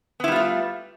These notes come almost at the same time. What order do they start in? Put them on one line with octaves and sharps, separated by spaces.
B3 E4 G3 F4 A3